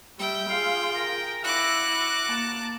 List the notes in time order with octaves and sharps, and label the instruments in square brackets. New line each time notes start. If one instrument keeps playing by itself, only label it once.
[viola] G3 E5 [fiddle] G5
[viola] F4 G#4 [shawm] F5
[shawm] A#4
[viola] E4 [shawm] F#4 [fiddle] D6 F#6
[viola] A#3 A5